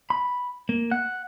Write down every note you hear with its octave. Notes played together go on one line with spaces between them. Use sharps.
B5
A#3
F#5